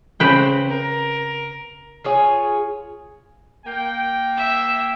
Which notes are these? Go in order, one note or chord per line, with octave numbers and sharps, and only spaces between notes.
C#3 C4 B4 G5
A#4
F4 G#4 C#5
A#3 G5
E5